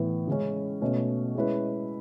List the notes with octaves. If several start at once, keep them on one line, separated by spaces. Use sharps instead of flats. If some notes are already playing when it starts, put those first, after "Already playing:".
Already playing: A2 E3 B3
C#3 G#3 C#4
B2 A3 C#4
G#3 C#4 E4 B4